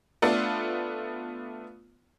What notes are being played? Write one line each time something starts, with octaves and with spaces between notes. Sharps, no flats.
A3 B3 D4 F4 A4